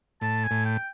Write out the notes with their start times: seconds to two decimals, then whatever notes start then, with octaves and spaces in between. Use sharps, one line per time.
0.21 A2 A5
0.44 G#5
0.51 A2
0.65 G5